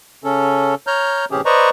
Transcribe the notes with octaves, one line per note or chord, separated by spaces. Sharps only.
C#3 C#4 A4
C#5 A#5 F6 G6
A2 C3 E3 C#4 G4 G#4
B4 C5 D5 D#5 A#5 C#6